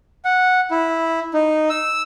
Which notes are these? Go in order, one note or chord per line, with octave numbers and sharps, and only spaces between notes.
F#5
E4
D#4
E6